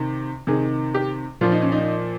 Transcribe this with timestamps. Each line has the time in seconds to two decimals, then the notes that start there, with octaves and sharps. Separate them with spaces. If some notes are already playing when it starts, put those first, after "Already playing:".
Already playing: C3 D#3
0.47 C3 D#3 G#4
0.95 G4
1.41 A#2 F3 F4
1.52 D#4
1.62 C#4
1.72 D#4